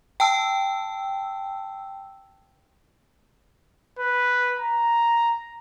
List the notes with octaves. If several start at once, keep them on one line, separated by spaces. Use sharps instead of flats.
G5 A5 E6
B4
A#5